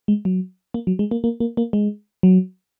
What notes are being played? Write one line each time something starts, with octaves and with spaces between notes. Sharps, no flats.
G#3
F#3
A#3
F#3
G#3
A#3
A#3
A#3
A#3
G#3
F#3